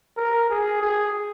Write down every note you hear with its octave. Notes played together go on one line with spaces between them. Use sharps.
A#4
G#4
G#4